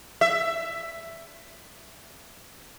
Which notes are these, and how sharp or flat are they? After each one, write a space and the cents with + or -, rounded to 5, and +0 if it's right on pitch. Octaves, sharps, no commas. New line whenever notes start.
E5 +10